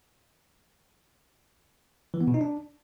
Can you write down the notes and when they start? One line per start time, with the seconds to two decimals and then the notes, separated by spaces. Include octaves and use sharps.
2.14 E3
2.21 B3
2.27 B2
2.34 D#4
2.41 D4